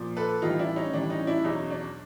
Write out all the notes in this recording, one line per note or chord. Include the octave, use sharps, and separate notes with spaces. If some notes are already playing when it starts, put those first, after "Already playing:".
Already playing: A#2 F3
A4 B4
A2 E3 G3 D#4 F4
D4 E4
C#4 D#4
A2 E3 G3 D4
C#4 D#4
D4 E4
E2 B2 F#3 C#4 D#4
D4